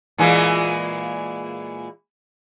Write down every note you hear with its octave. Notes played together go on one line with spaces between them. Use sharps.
A#2 E3 G#3